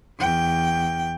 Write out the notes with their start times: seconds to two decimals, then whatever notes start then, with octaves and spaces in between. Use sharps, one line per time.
0.19 E2 G5